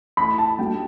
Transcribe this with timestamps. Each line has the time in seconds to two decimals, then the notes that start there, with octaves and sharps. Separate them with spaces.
0.17 E3 A3 E4 B5
0.38 A5
0.59 G3 D4 F#4 A4 G5